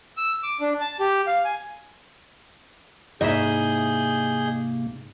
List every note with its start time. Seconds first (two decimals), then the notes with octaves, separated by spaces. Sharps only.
0.17 E6
0.43 D6
0.61 D4
0.80 A5
1.00 G4
1.27 F5
1.45 G#5
3.21 G#2 C3 A#3 E4 G#4 D#5 E5 G6